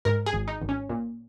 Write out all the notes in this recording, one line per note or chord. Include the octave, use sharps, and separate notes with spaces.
G#2 A#4
G#4
G#1
D#4
G#1
C#4
A#2